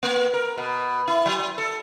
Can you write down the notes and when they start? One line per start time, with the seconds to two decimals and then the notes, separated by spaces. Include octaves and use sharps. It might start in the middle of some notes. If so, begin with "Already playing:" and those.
0.03 A#3
0.34 A#4
0.58 B2
1.08 E4
1.26 F#3
1.58 A4